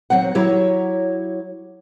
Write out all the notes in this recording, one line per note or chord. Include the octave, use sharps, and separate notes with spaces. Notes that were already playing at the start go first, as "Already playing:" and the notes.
D#2 D#3 F#3 C4 F#5
F#3 E4 G4 C#5